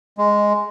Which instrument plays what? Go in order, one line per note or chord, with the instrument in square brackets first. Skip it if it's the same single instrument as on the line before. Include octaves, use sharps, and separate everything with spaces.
[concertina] G#3